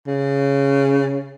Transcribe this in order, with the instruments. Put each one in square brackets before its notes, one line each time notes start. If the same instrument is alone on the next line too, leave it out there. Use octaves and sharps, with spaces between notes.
[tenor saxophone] C#3